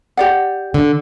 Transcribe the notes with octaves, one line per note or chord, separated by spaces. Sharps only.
G4 D5 F#5
D3